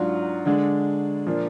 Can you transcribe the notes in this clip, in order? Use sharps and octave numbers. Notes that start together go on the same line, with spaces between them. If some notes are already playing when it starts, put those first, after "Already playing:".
Already playing: G#2 F#3 D4 F4
D3 G#3 D4
A#2 F3 A#3 D4